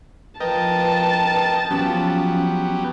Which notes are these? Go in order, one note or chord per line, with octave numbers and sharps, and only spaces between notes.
F3 A#4 B4 D#5 G5 A5
F3 F#3 B3 C#4 G4